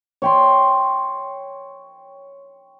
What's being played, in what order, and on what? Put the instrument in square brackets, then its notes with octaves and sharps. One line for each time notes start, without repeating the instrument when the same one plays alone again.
[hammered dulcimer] C#5 G5 C6